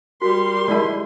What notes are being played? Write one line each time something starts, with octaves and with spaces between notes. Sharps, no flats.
G3 F#4 A#4 C6
G#3 E4 D5 A5